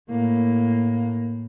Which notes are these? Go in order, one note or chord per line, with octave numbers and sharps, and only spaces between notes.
A2 A#3